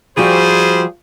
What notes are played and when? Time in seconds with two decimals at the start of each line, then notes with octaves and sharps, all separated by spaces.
0.17 F3 G3 F#4 G#4 C5